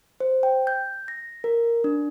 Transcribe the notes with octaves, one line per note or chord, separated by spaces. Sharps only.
C5
G5
G6
A#6
A#4
D4